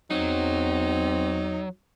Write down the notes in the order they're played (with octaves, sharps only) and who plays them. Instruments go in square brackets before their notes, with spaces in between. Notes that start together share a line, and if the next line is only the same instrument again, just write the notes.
[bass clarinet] E2 [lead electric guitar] F#3 [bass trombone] C4 [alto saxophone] D#4